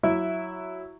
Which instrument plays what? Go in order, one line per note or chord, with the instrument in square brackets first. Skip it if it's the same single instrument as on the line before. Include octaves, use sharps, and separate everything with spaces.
[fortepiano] F#3 E4 E5